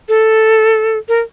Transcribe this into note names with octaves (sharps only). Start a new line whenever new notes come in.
A4
A#4